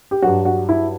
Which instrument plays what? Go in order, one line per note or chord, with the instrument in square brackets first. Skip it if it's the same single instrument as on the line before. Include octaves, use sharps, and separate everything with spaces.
[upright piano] G4
G2 F#3 F#4
F#4
E4